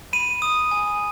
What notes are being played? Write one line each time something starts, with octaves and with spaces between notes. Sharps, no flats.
B5 D#7
D#6
G#5